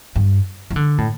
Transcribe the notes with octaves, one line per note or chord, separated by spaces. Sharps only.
G2
E3
D3
A2